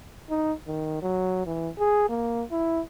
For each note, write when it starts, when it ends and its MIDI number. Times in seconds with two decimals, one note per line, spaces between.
0.30 0.53 63
0.67 1.00 51
1.02 1.44 54
1.46 1.69 52
1.79 2.08 68
2.09 2.42 58
2.52 2.81 64